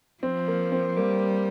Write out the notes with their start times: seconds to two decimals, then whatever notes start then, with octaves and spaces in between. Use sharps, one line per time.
0.23 F3 C4
0.48 A#3
0.72 C4
0.97 G3 A#3